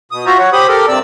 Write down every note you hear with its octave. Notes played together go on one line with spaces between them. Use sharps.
B2 D#6
F4 F#4 C5 E5 A#5
C#5 F#5
G4 C5 B5 D#6
G4 A4 A#4
G2 C3 C4 D5 E6